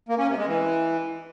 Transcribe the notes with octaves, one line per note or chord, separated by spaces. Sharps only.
A#3
C#4
C3
G#3
E3